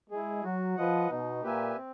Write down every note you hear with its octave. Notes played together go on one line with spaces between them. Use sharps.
G#3 E4 G#4
F#3 F#4
F3 B4 D#5 F#5
B2 D#4
A#2 G4 B4 E5 G#5
C4